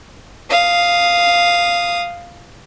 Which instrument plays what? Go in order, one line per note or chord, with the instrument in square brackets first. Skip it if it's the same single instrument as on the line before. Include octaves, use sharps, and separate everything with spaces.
[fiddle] F5 D#6